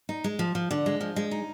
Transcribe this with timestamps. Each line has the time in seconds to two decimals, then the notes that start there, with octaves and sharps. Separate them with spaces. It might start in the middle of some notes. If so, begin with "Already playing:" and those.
0.09 D#4
0.24 G#3
0.39 F3
0.55 F3
0.71 D3
0.86 G#3
1.01 F3
1.16 G#3
1.31 D#4